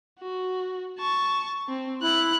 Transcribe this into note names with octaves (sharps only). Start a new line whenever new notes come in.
F#4
A5 C#6
C4
E4 F#6